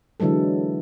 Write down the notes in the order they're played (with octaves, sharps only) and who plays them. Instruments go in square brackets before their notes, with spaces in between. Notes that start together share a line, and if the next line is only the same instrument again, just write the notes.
[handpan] D3 E3 F#3 G#3 A4